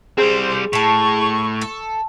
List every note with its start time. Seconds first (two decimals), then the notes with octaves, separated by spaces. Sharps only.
0.18 G3 C4 G#4 C5
0.73 A2 A5 B5 C#6
1.61 A4